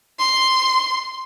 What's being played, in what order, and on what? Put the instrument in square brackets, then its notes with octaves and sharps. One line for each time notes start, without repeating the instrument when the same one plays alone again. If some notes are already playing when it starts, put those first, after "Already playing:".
[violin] C6